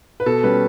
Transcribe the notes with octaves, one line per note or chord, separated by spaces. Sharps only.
B4
B2 A4
G3 C#4 B4